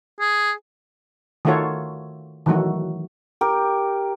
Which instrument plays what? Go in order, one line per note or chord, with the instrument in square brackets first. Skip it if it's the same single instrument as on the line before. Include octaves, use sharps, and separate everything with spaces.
[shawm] G#4
[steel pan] D#3 A3 F4 F#4 A4 C#5
D#3 E3 F#3 A3 F#4
[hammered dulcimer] G4 A#4